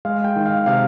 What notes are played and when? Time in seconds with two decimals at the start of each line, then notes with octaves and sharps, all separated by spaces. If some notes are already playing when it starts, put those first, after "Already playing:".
0.05 G#3 F5
0.24 G5
0.36 D#3
0.46 F5
0.66 C3 F5